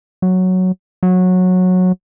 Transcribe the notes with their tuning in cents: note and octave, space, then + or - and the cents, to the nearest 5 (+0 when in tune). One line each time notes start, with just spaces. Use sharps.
F#3 +0
F#3 -15